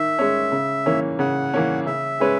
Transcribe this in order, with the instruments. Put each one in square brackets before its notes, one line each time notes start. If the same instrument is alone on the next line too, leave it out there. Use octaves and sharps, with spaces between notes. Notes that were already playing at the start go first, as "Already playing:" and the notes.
Already playing: [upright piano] D#3 [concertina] E5
[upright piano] G#3 C#4
C#3
E3 A#3 C#4
[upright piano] C#3 [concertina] F#5
[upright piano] E3 A#3 C#4
[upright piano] C#3 [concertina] E5
[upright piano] G#3 C#4 G#4 B4